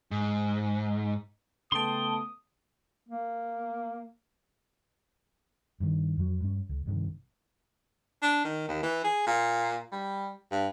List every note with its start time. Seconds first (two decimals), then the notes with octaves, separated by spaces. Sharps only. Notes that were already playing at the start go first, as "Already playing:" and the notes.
0.11 G#2
1.72 C#3 A3 B3 G5 A5 C6 D#6
3.09 A#3
5.80 G2 D#3
6.17 F2 F#3
6.41 G2 C#4
6.69 C#2
6.86 A#1 G2 C3 D#3
8.22 D4
8.44 D#3
8.69 D#2
8.83 E3
9.04 G#4
9.27 A#2
9.92 G3
10.51 G2